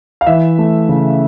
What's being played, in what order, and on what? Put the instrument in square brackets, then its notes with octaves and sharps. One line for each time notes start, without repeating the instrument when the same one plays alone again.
[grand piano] F5
E3 E5
A3
C#3